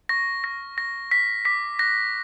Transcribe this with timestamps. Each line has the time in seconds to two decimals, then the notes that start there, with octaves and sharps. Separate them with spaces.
0.09 C#6 A#6
0.44 F6 A#6
0.77 C#6 A#6
1.11 F6 B6
1.45 D6 B6
1.79 F#6 A#6